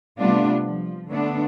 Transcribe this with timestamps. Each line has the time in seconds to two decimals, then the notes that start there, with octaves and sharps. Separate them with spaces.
0.18 C3 G3 A3 B3 D4 F4
0.63 F3
1.09 D3 A3 B3 D4